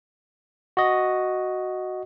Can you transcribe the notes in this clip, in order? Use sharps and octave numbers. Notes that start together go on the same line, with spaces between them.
F#4 D#5